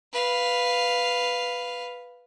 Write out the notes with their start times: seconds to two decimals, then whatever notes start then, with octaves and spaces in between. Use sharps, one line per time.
0.13 B4 F5